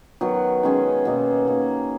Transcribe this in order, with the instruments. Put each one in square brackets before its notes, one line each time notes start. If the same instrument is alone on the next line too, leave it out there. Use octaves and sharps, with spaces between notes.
[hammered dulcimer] D#3 F#3 B3 F#4
D#3 G#3 C#4 G#4
B2 A#3 D#4
A#3 D#4 G#4